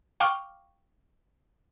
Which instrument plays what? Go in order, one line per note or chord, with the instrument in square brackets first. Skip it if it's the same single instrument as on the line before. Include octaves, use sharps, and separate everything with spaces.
[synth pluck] F5 G5 C#6 D6 F6